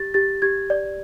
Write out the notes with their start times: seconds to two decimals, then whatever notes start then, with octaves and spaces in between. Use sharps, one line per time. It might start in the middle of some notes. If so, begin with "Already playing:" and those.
Already playing: G4 A6
0.14 G4 A6
0.42 G4 G#6
0.70 D5